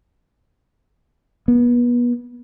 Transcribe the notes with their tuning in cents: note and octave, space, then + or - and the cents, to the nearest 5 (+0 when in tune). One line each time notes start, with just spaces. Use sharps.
B3 -30